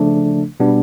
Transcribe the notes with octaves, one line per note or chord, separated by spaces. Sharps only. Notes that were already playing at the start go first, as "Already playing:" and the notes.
Already playing: C#3 F3 A3 D4
B2 G3 B3 D4